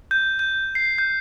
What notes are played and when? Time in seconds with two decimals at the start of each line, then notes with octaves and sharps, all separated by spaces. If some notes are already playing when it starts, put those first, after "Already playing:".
0.11 G6
0.39 G6
0.75 C7
0.98 G6